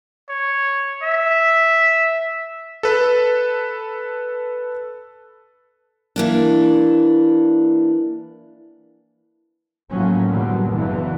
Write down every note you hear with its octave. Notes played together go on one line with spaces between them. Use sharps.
C#5
E5
A4 B4
E3 A#3 D4
A2 F3 F#3 A#3 C#4
F#2 B2 D3 F#3 G3
F#1 E2 B2 D3 E3